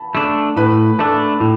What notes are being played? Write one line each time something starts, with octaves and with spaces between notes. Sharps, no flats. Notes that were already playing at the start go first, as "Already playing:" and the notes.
Already playing: A5 B5
A3 D4
A2 B4 B5
A3 D4 A4 A5
A2